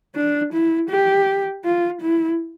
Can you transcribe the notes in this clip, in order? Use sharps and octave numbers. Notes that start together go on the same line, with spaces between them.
D4
E4
G4
F4
E4